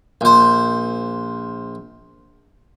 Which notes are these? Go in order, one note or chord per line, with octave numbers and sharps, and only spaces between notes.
A#1 C5